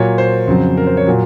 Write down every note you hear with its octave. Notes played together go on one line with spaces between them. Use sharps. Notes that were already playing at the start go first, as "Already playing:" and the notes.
Already playing: A#2 F#3 C#5
C5
F2 C#3 F#3
A#4
C5
C#5
A#2 F#3